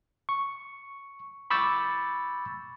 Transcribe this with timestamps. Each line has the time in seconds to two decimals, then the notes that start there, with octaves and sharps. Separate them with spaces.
0.29 C#6
1.50 B5 C#6 D6 E6 G6 A6